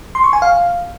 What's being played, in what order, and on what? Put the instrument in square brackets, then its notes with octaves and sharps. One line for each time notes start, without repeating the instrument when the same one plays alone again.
[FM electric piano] C6
C#6
G#5
F5